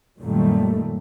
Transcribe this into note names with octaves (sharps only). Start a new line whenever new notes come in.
F#2 A#2 D#3 G3 A3